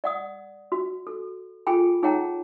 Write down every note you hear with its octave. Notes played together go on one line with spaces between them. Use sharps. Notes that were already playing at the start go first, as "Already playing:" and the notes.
D5 F#5 D#6
F#4
A4
F4 G#4 A4 G5 G#5 B5
D#4 G#4 C#5 F#5 G5 A#5